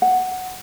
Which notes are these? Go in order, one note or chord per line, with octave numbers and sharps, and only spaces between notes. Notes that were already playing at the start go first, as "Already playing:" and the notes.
F#5